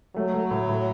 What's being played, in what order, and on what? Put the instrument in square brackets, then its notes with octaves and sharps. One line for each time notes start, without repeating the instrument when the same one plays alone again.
[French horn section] F#3 [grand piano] A3
[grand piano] A3
A2
A2